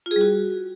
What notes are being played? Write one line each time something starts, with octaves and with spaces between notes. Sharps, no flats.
F4
G#4
G3
F#4